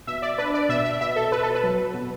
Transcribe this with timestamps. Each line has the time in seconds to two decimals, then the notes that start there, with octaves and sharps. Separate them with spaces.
0.07 B2 E5
0.22 D5
0.38 D4 B4
0.54 D5
0.69 B2 E5
0.85 E5
1.01 B2 E5
1.16 A4
1.32 B2 B4
1.43 A4
1.55 B4
1.63 F#3
1.94 B2